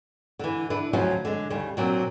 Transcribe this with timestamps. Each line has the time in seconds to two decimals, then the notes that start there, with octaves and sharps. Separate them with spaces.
0.39 D3 E3
0.70 D4 E4 B4
0.93 D2 F3 F#3 C#4
1.25 D3 G#3
1.50 D#2 C#3 G3
1.77 A#2 F#3 C4 D4